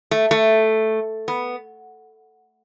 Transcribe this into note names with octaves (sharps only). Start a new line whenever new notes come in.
A3
A3
B3